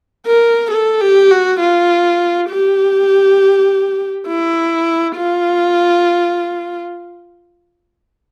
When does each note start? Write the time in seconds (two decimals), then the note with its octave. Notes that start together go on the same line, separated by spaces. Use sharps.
0.27 A#4
0.71 A4
1.01 G4
1.31 F#4
1.60 F4
2.50 G4
4.27 E4
5.17 F4